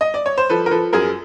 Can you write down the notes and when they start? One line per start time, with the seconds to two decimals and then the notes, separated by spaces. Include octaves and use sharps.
0.01 D#5
0.14 D5
0.26 C#5
0.38 C5
0.50 F3 A4 B4
0.66 A#4
0.71 F3 A4 B4
0.93 F#2 G#4 A#4